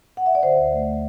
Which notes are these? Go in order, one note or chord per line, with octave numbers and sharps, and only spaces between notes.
F#5
E5
D5
D3 C5
D2
A3